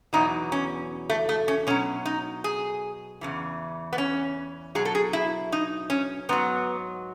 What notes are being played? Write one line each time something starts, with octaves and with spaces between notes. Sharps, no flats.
E2 B2 F#3 D#4
C#4
A3
A3
C#4
B2 F#3 C#4
D#4
G#4
E2 C#3 E3
B3
C#4
B2 F#3 G#4
A4
G#4
E4
D#4
C#4
G#2 F#3 B3